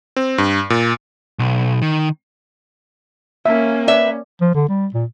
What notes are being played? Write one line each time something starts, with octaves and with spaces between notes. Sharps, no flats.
C4
G2
A#2
B1
D#3
A#3 C#4 E5
B4 D5 E5
F3
D3
G3
A#2